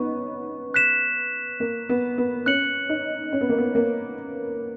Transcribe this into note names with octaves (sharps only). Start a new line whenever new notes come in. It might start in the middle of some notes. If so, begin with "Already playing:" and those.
Already playing: B3 C#4 D#4 C#6
F#6 B6 E7
A#3
B3
B3
C#4 F#6 C#7 F#7
D#4
C#4
B3
A#3
B3
A#3